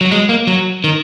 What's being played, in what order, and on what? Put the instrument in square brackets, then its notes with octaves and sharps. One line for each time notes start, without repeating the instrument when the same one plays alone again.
[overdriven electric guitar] F#3
G#3
A#3
F#3
D#3